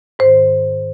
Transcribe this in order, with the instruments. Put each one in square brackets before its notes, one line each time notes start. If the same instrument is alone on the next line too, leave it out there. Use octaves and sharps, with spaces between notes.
[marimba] G#2 D#3 C5